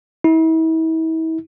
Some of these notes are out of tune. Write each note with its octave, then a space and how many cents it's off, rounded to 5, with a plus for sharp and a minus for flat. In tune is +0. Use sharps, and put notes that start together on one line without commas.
E4 -40